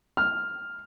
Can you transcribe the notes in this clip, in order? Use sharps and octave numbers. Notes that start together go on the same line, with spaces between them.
F6